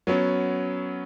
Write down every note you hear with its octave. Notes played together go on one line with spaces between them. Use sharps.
F#3 B3 C#4